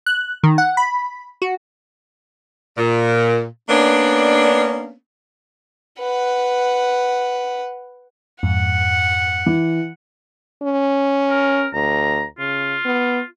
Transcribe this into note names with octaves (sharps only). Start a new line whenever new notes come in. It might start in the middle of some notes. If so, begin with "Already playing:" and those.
F#6
D#3
F#5
B5
F#4
A#2
A#3 B3 C#4 D4
B4 F#5
F2 G#2 F#5
E3
C#4
A#4
D2 A#5
C#3 F4
B3